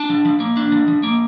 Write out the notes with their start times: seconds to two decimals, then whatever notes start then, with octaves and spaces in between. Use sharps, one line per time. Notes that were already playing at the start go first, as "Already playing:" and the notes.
Already playing: D4 A5
0.10 F3
0.25 F3
0.40 A#3
0.57 D4
0.72 F3
0.88 F3
1.03 A#3